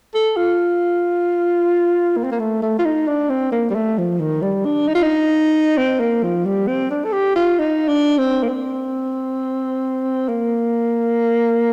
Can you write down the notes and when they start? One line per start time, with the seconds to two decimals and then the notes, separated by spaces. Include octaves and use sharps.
0.15 A4
0.37 F4
2.17 A#3
2.24 C4
2.32 A#3
2.40 A3
2.62 A3
2.79 F4
2.85 D#4
3.08 D4
3.30 C4
3.52 A#3
3.70 G3
3.75 A3
3.98 F3
4.20 D#3
4.42 G3
4.65 D4
4.88 D#4
4.95 F4
5.03 D#4
5.77 C4
6.00 A#3
6.23 F3
6.46 G3
6.68 C4
6.91 D4
7.05 A4
7.13 G4
7.36 F4
7.59 D#4
7.88 D4
8.19 C4
8.43 A#3
8.49 C4
10.29 A#3